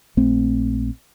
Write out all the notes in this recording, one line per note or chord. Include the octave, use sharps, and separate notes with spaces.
A#1 A3 C4